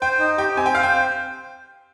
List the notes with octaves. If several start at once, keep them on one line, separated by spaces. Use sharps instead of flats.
C5 G5
D#4
G4 G5
C4 G#5
G5
C5 F5
G5